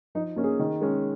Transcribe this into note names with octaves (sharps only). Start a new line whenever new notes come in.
F3 D#4
A#3 C#4
G#4
D#3
G#3 C#4